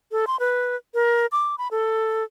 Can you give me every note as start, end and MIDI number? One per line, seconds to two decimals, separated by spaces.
0.12 0.25 69
0.27 0.36 84
0.40 0.76 71
0.94 1.26 70
1.32 1.55 86
1.58 1.68 83
1.71 2.24 69